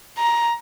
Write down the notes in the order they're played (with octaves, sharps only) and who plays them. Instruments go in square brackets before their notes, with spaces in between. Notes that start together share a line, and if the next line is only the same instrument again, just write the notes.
[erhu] A#5